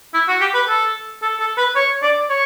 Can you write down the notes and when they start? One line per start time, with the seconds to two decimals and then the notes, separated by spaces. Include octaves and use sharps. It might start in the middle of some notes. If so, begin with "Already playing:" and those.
0.14 E4
0.28 F#4
0.41 G4
0.54 B4
0.68 A4
1.22 A4
1.39 A4
1.57 B4
1.75 C#5
2.02 D5
2.30 C#5